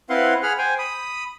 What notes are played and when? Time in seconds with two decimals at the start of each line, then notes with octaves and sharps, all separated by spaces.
0.10 C4 E4 B4 F5 F#5 C6
0.43 G#4 F#5 B5 F6
0.58 C5 G5 G#5
0.79 B5 D#6